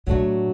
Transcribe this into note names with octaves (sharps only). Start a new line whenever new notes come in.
A2 F#3 A3 D4 F#4